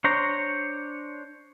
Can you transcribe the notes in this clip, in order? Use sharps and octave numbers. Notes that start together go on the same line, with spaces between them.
D4 C5 C#5 A#5